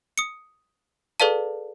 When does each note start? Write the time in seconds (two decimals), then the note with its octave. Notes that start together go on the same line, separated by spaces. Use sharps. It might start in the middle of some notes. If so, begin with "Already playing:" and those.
0.18 D#6 C#7
1.20 G#4 A4 B4 D5 F5 A5